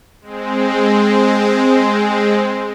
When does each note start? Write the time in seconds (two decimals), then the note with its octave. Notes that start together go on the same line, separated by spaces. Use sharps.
0.21 G#3 C4